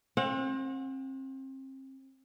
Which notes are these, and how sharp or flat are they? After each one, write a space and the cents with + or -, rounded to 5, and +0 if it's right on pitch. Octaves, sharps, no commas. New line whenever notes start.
C4 +35 F#5 -30